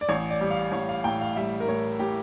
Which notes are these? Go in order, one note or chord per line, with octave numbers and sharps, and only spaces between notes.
D5
A1 C#5
D5
G3
F5
A1 C#5
F5
A2 G5
F5
G3 E5
A#4
A2 C#5
A2 G4